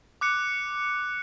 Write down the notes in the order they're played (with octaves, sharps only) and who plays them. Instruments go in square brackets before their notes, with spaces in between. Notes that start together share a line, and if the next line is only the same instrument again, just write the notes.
[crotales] D6 F#6 C#7